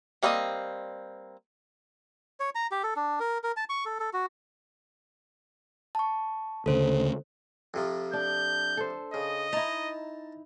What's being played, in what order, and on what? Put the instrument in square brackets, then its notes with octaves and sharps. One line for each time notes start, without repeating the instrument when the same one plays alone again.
[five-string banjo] G3 A#3 C4 F4 D#5
[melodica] C#5
A#5
G4
A4
D4
A#4
A#4
A5
C#6
A4
A4
F#4
[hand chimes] A5 C#6
[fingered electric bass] D2 C#3 [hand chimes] A4 C5
[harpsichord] F2 C3 F3
[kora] D4 [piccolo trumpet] G6
[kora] A4 C5
[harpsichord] C#3 [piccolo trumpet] D#5
[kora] D#4 E4 [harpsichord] A5 A#5 C6